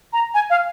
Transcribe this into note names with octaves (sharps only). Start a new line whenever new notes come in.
A#5
G#5
F5